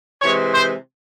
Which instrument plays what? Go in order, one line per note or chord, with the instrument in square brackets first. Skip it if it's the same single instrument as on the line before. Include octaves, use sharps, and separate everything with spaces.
[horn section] C3 E3 G#3 C#5
C5